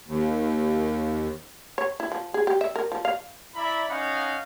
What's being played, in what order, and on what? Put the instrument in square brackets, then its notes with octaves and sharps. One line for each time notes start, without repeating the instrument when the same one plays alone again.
[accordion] D#2
[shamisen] C#5
E4
F3
G#4
G4
E5
A#4
F3
F5
[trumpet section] E4 D5 E5 A#5 B5
C#4 D#4 D#5 F5 F#5